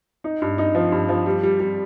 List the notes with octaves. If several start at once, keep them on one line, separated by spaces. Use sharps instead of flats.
D#4
G2
D#4
F3
G2
F3
G3
G3
G3